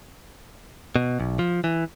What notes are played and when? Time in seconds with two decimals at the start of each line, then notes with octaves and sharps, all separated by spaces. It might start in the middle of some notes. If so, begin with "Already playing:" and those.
0.96 B2
1.19 B1
1.39 F3
1.64 E3